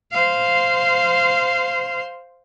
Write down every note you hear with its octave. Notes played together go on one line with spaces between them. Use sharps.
C5 F5